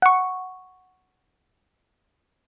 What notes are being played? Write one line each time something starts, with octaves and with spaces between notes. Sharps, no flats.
F#5 C#6